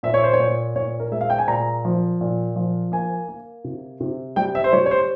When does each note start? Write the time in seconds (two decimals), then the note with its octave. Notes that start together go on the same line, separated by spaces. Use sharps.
0.03 A#2 E5
0.14 C#5
0.24 C5
0.33 C#5
0.40 A#2
0.76 A#2 C#5
1.00 A#4
1.12 G#3 E5
1.21 F5
1.30 G5
1.39 G#5
1.47 A#2 A#5
1.85 F3
2.21 A#2
2.56 F3
2.92 A#3 G#5
3.28 A#3
3.64 C3
4.01 C3
4.36 G3 G5
4.55 E5
4.64 C5
4.73 G3 C#5
4.86 C#5
4.91 C5